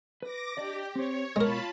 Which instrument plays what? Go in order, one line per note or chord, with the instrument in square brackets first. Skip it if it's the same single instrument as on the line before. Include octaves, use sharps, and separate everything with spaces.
[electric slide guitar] B4 [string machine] D6 A#6
[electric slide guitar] D4 D5 D#5 [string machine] G4
[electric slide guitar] C4 C5 [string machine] C#5
[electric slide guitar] B2 C#5 [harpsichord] G#3 A#4 [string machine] F4 A5 B5